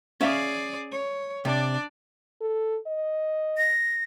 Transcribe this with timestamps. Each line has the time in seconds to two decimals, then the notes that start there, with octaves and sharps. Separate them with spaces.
0.21 C#4 G#4 D5 E5 F5
0.92 C#5
1.45 C3 D4 D5
2.41 A4
2.87 D#5
3.57 A#6